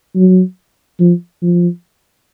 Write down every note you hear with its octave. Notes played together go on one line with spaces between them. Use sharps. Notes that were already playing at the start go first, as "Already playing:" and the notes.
F#3
F3
F3